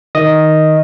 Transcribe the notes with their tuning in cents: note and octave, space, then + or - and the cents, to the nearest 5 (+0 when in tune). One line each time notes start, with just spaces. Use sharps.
D#3 +5 D#5 +0 D#6 +0